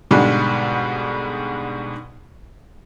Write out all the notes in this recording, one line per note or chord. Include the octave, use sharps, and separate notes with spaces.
G#2 B2 D3 G3 G#3